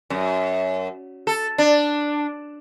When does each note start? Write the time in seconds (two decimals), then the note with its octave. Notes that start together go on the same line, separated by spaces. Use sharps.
0.10 F#2
1.27 A4
1.58 D4